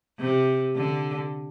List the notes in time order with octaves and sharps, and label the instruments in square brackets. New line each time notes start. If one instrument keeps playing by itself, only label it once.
[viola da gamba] C3
D3